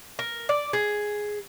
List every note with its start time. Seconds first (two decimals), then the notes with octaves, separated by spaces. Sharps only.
0.19 A#4
0.49 D5
0.73 G#4